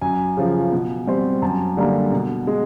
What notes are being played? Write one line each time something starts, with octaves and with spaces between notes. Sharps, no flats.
F#2 G#5
C#3 F3
B2
G3 C4
F#2 A5
D3 G3 A#3
B2
G#3